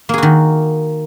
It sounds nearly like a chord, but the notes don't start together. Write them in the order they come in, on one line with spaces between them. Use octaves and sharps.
A#3 G#4 F#4 D#3